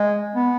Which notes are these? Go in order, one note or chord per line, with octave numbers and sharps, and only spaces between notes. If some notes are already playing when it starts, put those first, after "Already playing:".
Already playing: G#3
B3